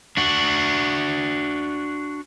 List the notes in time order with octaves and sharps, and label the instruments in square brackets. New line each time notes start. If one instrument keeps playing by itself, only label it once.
[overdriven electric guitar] D4 F#4